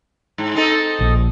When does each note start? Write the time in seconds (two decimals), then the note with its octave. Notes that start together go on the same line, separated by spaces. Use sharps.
0.38 G#2
0.55 C4 D#4 A4
1.01 A#1